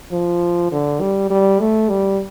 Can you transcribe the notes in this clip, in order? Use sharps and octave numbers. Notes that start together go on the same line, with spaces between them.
F3
D3
G3
G3
A3
G3